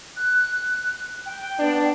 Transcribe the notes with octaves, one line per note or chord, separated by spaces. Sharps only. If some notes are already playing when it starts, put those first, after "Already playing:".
F#6
G5
B3 D4